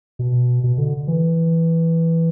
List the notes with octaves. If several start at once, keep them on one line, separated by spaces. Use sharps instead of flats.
B2
B2
D3
E3